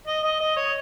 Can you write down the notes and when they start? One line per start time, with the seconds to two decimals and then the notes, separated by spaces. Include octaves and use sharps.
0.07 D#5
0.24 D#5
0.40 D#5
0.57 C#5